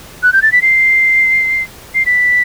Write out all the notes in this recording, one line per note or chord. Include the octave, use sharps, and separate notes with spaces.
F#6
G6
A6
B6
C7
C7
B6